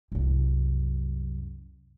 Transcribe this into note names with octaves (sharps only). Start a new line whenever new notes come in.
C2 F#2